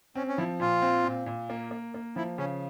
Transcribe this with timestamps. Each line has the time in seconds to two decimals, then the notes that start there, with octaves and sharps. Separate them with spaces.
0.15 C4 C#4
0.28 C#4
0.37 F3 E4
0.60 A#2 F4
0.82 C4
1.04 A#2
1.26 A#2
1.50 A#3
1.71 A#3
1.94 A#3
2.16 F3 E4
2.38 C#3 C#4